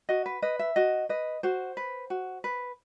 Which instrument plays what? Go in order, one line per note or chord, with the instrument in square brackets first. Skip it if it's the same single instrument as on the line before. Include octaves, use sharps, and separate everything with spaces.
[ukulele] F#4 D#5
B4
B4 D#5
E5
F#4 D#5
B4 D#5
F#4 C5
B4
F#4
B4